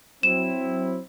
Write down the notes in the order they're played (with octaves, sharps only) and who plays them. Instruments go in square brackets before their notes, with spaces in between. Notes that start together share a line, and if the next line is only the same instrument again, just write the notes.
[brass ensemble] F#3 C4 E4 [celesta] E7